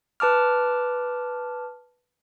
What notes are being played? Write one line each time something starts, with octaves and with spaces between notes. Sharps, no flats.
B4 A5 D6 F6